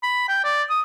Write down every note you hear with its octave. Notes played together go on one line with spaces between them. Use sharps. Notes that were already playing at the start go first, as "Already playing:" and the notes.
B5
G5
D5
D#6